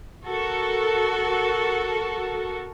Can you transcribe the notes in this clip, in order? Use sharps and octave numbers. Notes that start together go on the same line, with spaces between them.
F#4 A4 A#4